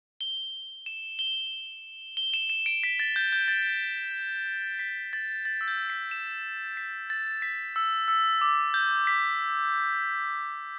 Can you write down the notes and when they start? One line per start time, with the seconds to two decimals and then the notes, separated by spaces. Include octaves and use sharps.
0.21 G7
0.86 E7
1.19 G7
2.17 G7
2.34 E7
2.50 E7
2.66 D7
2.83 B6
2.99 A6
3.16 G6
3.33 G6
3.48 A6
4.79 B6
5.13 A6
5.45 A6
5.61 E6
5.68 G6
5.90 B6
6.11 E7
6.77 B6
7.10 A6
7.42 B6
7.76 E6
8.08 E6
8.41 D6
8.74 G6
9.07 B6